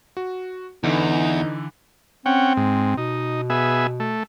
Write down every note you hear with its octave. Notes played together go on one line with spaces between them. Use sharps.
F#4
E2 D3 E3 D#4
C4 C#4 F#5 G5
G#2
B2 D#4
B3 G#4 E5
A3